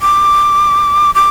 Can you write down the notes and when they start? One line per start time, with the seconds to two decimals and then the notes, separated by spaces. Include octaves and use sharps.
0.02 D6
1.15 D6